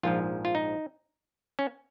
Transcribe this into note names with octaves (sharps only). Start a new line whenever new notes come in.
A#1 G#2 F3 F4
F4
D#4
C#4